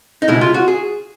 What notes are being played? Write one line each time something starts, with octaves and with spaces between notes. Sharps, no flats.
D#4
C#2 B2 G#3 E4
F4
F#4
G#4